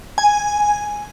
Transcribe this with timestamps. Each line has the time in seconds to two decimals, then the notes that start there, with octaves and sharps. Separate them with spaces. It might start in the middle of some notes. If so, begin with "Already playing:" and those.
0.18 G#5